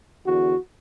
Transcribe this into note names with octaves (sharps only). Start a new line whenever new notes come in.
E2 D3 F#4